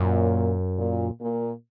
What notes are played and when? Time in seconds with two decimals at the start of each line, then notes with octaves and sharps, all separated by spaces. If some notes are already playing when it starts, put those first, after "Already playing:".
Already playing: F#2 A#2
0.78 A#2
1.21 A#2